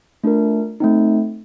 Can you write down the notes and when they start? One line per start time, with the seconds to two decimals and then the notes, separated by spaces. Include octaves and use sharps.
0.24 A3 D4 F4 A#4
0.80 A3 C4 D#4